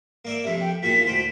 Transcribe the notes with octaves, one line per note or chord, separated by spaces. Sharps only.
A#3 D5 E5
F2 C3 E5
G5
E2 A#2 F#4 B6
D2 C5 G5